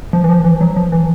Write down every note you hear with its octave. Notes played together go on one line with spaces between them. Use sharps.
F3
E3
F3
E3
F#3
F3
E3